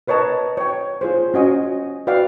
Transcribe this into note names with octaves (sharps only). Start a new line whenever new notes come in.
A#4 B4 C#5 D#5 A5
C#5 G5
F4 G#4 C5
C#4 F#4 D#5 G#5
F#4 B4 D5 F5 G5